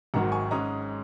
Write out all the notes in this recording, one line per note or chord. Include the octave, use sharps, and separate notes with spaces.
G#1 G#2 D#3 F#3 F#5 A#5
G#5 C#6
G#2 G#3 C#4 A#5 D#6